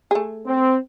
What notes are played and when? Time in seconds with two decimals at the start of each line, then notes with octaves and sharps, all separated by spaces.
0.11 A3 G#4
0.46 C4